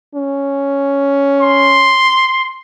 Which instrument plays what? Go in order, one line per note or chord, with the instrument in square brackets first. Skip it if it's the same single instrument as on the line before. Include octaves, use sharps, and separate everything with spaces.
[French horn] C#4
[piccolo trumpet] C6